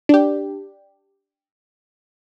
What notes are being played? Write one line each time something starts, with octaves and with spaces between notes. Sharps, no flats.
D4 G4